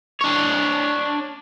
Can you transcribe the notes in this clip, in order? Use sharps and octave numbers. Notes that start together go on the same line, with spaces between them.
D4 C#5